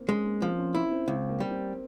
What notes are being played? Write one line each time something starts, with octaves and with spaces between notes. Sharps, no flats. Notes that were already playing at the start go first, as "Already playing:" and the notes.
Already playing: A#3 C4
G#3 C#4
A#3
F3 C4
C#4
E4
C4
C#2 C4
A#3
G3
C4